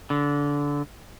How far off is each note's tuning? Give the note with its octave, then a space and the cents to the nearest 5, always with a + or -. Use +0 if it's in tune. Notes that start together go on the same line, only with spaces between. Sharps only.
D3 -20